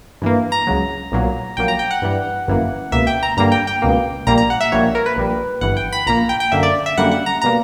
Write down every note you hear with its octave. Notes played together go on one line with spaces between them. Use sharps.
G2 E3 A#3
A#5
C#2 C#3 F#3
B1 A#2 F#3 A#3
A#1 A#2 F#3 A#3 G5
A#5
G5
F#5
G2 E3 G3
G1 F#2 E3 A#3
C#2 B2 A#3 E5
G5
A#5
G2 D3 G3 A#3 A#5
G5
G5
C#2 B2 A#3
A#1 A#2 G3 A#3 A#5
A#5
F#5
E5
A#1 A#2 G3 A#3 C#5
A#4
B4
A#1 A#2 G3
G1 G2 E3 F#5
G5
B5
A#1 A#2 A#3 A#5
G5
G5
F#2 D3 A#3 E5
D5
E5
F#2 D3 G3 A#3 F#5
F#5
A#5
B2 G3 A#3 A#5